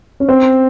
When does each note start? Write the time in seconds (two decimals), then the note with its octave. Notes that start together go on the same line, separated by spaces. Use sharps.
0.20 C#4
0.29 C4